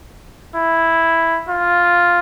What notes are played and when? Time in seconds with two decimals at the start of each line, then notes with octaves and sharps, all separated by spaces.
0.56 E4
1.49 F4